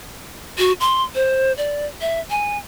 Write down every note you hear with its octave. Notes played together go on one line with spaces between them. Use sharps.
F#4
C6
C5
D5
E5
G#5